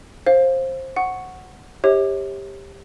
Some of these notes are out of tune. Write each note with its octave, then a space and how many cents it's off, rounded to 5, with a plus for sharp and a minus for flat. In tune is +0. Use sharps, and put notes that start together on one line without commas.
C5 +20 F5 +0
F#5 +0 C#6 +0
G4 +15 C#5 -30 E5 -45